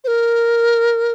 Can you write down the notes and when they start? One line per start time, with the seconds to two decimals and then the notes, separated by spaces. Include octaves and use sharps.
0.04 C5
0.08 A#4